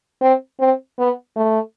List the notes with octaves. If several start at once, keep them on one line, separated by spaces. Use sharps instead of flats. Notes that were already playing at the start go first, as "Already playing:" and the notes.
C4
C4
B3
A3